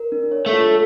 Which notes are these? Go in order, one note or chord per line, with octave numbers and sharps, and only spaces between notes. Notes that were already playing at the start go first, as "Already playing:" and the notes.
Already playing: A#4
D4
C#5
A3
F4